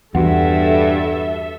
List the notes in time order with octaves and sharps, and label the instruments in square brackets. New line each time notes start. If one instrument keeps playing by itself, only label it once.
[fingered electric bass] E2 [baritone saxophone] G2 [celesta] F#4 F#5 [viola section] A4 E5